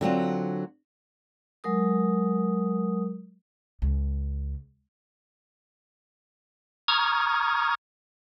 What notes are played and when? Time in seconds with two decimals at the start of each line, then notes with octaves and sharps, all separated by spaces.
0.01 D3 F#3 C4 F4
1.64 F#3 G#3 A#4 D#6
3.82 C#2
6.88 A#5 C#6 D#6 F6 G#6